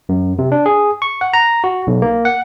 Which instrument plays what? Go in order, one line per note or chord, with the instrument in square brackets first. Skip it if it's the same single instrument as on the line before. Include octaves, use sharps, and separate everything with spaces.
[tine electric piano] F#2
C3
D4
G#4
C#6
F#5
A#5
F#4
B1
A#3
F#5